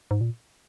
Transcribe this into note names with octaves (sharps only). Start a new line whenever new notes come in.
G#2
A#2